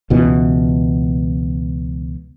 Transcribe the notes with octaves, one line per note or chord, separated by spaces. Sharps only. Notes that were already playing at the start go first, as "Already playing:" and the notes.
C#2 B2 E3